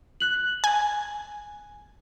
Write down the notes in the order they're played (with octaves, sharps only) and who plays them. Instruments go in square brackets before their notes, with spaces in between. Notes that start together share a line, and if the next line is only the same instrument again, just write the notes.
[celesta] F#6 F#7
[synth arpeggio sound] G#5